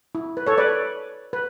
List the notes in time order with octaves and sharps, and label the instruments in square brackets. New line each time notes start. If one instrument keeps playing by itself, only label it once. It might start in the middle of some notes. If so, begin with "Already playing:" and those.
[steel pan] E4
B4
A4 C#5
B4 D5
B4